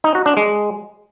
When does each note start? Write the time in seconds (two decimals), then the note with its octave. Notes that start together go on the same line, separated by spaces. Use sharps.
0.04 D#4
0.15 F#4
0.26 D4
0.37 G#3